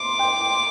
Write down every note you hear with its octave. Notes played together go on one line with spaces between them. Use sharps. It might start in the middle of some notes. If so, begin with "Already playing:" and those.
Already playing: C6 D6
G5